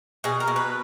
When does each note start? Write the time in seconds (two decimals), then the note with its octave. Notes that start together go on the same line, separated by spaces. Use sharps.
0.24 B2 G#4
0.40 A#4
0.48 B2
0.56 B4